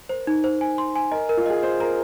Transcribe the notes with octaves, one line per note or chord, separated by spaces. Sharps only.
A#4 C5
D#4
C5
G#5
C6
G#5
A#4 D#5
A#4
F4
G#4 D#5
C5 D#5
A#4 A#5